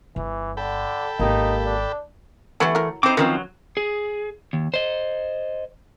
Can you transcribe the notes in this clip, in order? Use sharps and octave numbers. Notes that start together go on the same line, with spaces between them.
G1 E3
D3 A4 G5 B5
G#1 A#3 D#4 G4
D4
E3 G3 A3 B3 E4
F#3 E4 A#4
C4 D#4 E4 C5 D6
D#3 F3 F#3 C4 C#4 A#4 B4
G#4
D#2
C5 D#5